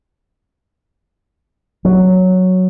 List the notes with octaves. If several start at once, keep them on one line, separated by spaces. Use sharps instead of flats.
F#3